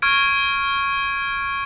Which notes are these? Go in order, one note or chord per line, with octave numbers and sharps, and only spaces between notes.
C#6 F6 G#6 D7